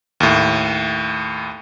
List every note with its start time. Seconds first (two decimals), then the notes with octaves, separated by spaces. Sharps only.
0.20 D#2 A2